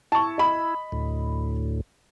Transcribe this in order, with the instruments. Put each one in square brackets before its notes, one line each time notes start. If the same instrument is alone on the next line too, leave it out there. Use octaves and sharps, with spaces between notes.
[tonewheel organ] E4 [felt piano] A5 C#6
[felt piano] D#5 B5
[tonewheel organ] D2 A2